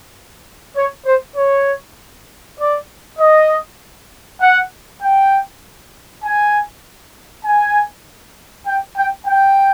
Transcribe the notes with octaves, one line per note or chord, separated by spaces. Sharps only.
C#5
C5
C#5
D5
D#5
F#5
G5
G#5
G#5
G5
G5
G5